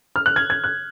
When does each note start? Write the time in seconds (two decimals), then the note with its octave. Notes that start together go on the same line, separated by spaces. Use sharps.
0.16 F6
0.26 F#6
0.36 G#6
0.50 G#6
0.64 F#6